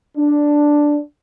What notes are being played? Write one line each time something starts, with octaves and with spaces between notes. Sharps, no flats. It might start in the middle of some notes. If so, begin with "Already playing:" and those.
D4